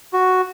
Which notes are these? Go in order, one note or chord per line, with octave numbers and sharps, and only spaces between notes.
F#4